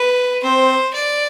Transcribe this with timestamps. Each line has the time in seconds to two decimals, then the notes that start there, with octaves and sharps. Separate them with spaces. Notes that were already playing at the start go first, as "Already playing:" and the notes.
Already playing: B4
0.43 C4 C5
0.94 D5